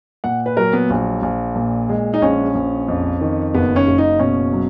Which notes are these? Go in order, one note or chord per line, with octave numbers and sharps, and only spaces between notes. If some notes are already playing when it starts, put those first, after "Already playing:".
A#2 F#5
B4
F#3 A#4
B3
A#1
A#1
A#2
G#3
D#4
A#1 C#4
A#1
F2
D#3
F#1 B3
C#4
F#1
D#4
B2 C#4
F#3